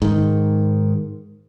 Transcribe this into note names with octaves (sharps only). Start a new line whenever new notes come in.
G#2 D#3